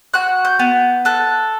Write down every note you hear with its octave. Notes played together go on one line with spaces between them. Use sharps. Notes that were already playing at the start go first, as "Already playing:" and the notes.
F#4 F#6
G6
B3
A4 F#6